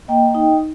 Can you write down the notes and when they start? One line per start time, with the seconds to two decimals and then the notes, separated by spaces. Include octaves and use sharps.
0.08 A#3 D#5 G5
0.35 D#4